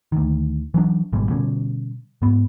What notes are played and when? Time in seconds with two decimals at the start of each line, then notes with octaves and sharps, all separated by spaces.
0.12 D2 D#3
0.74 E3 F#3 D4
1.13 G#1 B2 G3 G#3
1.30 B2 D3 G3 C#4
2.22 G#2 B3